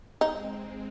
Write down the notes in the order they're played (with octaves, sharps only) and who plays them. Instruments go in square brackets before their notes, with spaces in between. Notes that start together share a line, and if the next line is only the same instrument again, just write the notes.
[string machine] G#3 C4 [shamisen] D#4